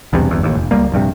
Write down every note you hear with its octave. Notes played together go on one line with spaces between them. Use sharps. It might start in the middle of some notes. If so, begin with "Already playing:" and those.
B1 E2 G2 C3
G1 E2
A1 D#2
F1
C#2 G3 A#3
A#1 G2 C3